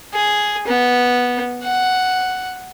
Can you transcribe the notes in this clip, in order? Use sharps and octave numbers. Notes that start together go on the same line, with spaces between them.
G#4
B3
F#5